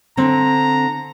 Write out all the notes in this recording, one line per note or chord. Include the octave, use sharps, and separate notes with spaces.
D3 C4 A#5